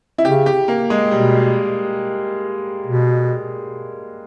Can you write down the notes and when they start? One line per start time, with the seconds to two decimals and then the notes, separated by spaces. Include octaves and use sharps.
0.18 E4
0.25 C#3 G4
0.46 G4
0.68 A#3
0.90 G#3
1.11 B2 G3
2.87 B2